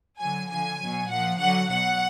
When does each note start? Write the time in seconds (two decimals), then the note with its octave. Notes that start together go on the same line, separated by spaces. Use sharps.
0.19 D3 F#3 G#5
0.48 D3 F3 G#5
0.79 B2 F#3
1.09 A#2 F3 F#5
1.39 D3 F#3 F#5
1.69 B2 F#3 F#5